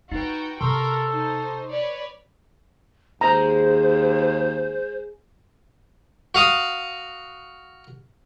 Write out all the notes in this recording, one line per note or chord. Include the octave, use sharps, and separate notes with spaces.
D#4 E4 F#4 B4 G5
C3 A4 A#4 C6 C#6 E6
D#4 C5
B4 C#5 D5
D#2 G#3 C5 A#5
F#4 F5 D#6